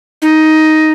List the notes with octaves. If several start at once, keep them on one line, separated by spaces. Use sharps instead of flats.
D#4